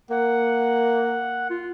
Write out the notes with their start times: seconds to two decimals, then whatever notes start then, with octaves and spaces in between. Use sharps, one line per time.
0.11 A#3 F#5
1.50 F4